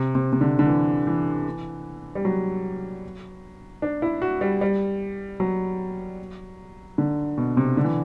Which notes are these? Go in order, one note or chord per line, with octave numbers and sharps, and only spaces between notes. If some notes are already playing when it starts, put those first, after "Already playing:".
Already playing: C3
C3
C3
D3
D3
E3
E3
G3
F#3
D4
E4
F#4
G3
G3
F#3
D3
B2
C3
D3
E3